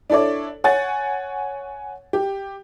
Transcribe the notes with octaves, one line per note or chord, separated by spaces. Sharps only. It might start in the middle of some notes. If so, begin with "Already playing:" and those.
D4 E4 A4 C#5 D5
C#5 F#5 G#5 A6
G4